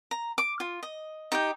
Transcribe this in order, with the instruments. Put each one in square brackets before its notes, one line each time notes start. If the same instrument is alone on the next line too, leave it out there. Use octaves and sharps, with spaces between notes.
[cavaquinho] A#5
D6
F4
D#5
D#4 G4 G5